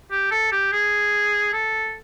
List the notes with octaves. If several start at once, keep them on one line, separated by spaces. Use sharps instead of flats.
G4
A4
G4
G#4
A4